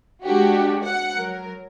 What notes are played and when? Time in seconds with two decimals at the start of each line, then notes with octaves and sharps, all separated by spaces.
0.24 G#3 D4 F#4 G4
0.84 F#5
1.16 F#3 A#4